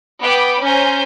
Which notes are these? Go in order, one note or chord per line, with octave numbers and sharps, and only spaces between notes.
B3 G5 B5 D6
C#4 C5 G#5 A#5 G6